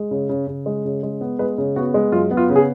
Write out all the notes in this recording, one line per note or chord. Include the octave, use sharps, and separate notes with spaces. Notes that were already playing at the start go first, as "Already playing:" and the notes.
Already playing: G#3
C#3
C#3
C#3
G#3
C#3
G#3
B3
G#3 B4
C#3
B3 F#4
G#3
F#2 F4
B3
F4
C#3
G#4